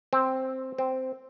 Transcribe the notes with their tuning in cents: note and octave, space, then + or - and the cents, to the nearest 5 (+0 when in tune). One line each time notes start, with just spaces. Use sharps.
C4 +5
C4 -5